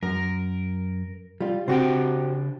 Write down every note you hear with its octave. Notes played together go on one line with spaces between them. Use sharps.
F#2 A#4
G3 F4
C#3 C4 D4 F#4 G4 G5